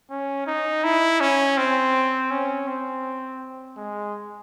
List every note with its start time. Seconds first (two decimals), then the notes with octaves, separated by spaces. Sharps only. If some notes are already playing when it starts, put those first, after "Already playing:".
0.11 C#4
0.47 D#4
0.84 E4
1.20 C#4
1.57 C4
2.31 C#4
2.68 C4
3.77 G#3